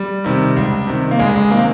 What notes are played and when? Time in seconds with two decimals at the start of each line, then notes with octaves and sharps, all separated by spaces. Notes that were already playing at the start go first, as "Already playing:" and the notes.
Already playing: G3
0.24 C3 D#3
0.57 C#2
0.87 C3 D#3
1.11 A#3
1.19 C#2 G#3
1.35 G#3
1.51 C3 D#3 A#3